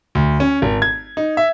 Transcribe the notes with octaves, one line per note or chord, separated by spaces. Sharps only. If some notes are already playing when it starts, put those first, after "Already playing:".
D2
C#4
G#1
G#6
D#4
E5